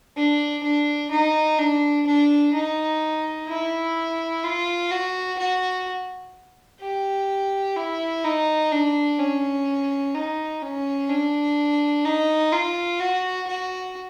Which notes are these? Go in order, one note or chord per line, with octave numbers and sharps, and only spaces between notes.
D4
D4
D#4
D4
D4
D#4
E4
F4
F#4
F#4
G4
E4
D#4
D4
C#4
D#4
C#4
D4
D#4
F4
F#4
F#4